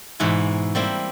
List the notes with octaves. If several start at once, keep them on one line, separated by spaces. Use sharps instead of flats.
G#2 B2 E3 E4
G3 A#3 C4 E4